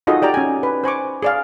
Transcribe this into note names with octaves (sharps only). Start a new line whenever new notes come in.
D#4 F4 F#4 G#4 A4 D#5
G4 D5 G5 A#5
C#4 G#5
B4
C5 G#5 C#6 D6
G#4 D5 F5